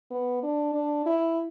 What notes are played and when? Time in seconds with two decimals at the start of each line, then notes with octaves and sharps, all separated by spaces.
0.11 B3
0.43 D4
0.74 D4
1.05 E4